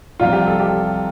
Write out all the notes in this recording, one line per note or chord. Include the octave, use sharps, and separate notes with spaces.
C2 C3 F3 F4
G4
A4
G4